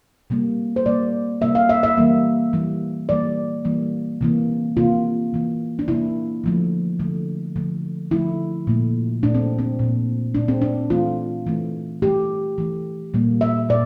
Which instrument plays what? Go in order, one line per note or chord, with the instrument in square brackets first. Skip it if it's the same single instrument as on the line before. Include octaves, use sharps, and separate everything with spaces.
[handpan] C3 G3 A#3
C5
C3 G3 A#3 D5
C3 G3 A#3 E5
F5
E5
E5
E3 G3 A#3
E3 G3 A#3
E3 G3 A#3 D5
E3 G3 A#3
C3 E3 A#3
C3 E3 A#3 F4
C3 E3 A#3
D4
C3 E3 A#3 E4
D3 F3 A3
D3 F3 A3
D3 F3 A3
D3 F3 A3 E4
A#2 A3
A#2 A3 D4
C4
C4
A#2 A3
A#2 A3 D4
C4
D4
E3 A3 F4
E3 A3
E3 A3 G4
E3 A3
A#2 G3 A#3
E5
A#2 D5